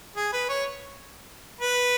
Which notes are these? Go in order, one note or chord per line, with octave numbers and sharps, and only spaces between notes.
G#4
B4
C#5
B4